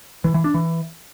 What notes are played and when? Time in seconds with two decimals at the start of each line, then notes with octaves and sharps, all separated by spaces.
0.24 E3
0.34 E3
0.44 D4
0.54 E3